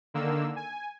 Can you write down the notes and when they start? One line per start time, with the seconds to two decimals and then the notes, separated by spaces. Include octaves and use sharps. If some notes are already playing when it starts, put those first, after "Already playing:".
0.14 D3 D#3 A#3 E6
0.56 G#5